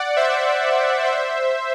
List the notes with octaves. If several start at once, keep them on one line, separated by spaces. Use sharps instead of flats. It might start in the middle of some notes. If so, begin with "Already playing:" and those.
Already playing: D5 F#5
C5 E5
C5 E5